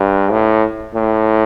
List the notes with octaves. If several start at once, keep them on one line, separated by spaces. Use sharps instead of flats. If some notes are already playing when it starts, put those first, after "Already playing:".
Already playing: G2
A2
A2